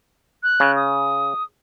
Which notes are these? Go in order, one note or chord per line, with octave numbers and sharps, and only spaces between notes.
F#6
C#3
D#6